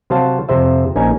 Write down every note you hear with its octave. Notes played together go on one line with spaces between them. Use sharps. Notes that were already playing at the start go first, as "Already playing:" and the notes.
C3 F#3 C5 F5 A5
F2 C3 C5 E5
A#1 C#4 D#4 G#5 A#5